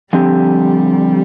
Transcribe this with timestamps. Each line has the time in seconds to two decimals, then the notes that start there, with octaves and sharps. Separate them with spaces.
0.13 D3 F3 G3 C4 G4